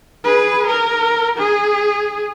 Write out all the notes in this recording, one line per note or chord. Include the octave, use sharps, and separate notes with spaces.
G#4 B4
A#4
G#4